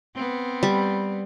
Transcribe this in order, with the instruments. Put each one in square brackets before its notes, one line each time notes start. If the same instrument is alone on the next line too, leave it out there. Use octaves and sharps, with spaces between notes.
[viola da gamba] B3 C4
[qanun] G3